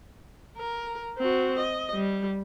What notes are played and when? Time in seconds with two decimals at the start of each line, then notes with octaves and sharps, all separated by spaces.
0.58 A#4
1.18 C4 F#4
1.59 D#5
1.94 G3